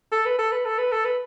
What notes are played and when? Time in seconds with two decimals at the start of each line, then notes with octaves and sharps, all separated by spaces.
0.12 A4
0.26 B4
0.39 A4
0.52 B4
0.65 A4
0.79 B4
0.92 A4
1.05 B4